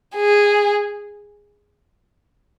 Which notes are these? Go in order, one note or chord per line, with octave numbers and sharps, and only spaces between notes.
G#4